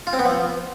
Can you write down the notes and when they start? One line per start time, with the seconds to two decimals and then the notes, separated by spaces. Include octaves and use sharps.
0.07 F4
0.13 C4
0.19 B3
0.25 F3